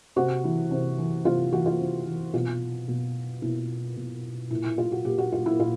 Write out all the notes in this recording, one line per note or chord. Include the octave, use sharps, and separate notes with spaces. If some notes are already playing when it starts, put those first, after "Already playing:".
C3 F#4
E3
C3
E3
C3 F4
E3 F#4
F4
C3
E3
B2 F4
B2
B2 E4
B2
A#2 E4
E4
F4
F#4
A#2 G4
F#4
F4
E4
A#2 F4